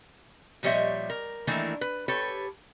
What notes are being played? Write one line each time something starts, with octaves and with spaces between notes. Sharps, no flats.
A#2 F3 G3 C#5 D#5 E5
A#4
D#3 E3 A3 A#3 D4 E4
B4
G4 A4 B4 C#5